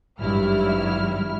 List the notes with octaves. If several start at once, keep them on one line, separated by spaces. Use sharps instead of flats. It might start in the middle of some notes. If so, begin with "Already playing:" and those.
G#1 G2 F#3 G3 E4 F6